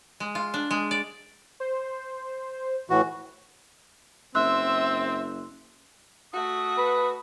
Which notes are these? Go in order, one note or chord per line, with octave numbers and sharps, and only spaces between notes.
G#3
F4
D4
G#3
D5
C5
A2 E3 F#4
F#1 C4 E5 C6 E6 F#6
A3 F#4 D#6
B4